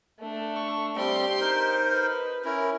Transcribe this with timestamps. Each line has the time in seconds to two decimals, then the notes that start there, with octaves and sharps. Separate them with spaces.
0.19 A3 D4
0.56 C#6
0.96 G3 C4 G4 C6
1.40 D#4 A#4 C5
1.92 B4
2.45 C#4 E4 A#4